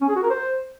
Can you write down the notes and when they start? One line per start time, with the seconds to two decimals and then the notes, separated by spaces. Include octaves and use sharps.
0.01 C#4
0.08 G#4
0.16 F#4
0.23 A#4
0.30 C5